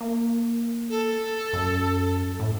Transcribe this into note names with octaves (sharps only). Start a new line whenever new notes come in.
A#3
A4
F#2
A2